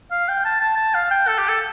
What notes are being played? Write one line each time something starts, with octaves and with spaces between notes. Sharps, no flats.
F5
G5
A5
A5
A5
F5
G5
A4
G4
A4